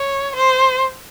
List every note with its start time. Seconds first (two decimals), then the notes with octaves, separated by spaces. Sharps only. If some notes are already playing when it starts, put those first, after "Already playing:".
Already playing: C#5
0.36 C5